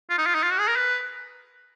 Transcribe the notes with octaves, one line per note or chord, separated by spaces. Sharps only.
F4
D#4
F4
D#4
F4
F#4
G#4
A#4
B4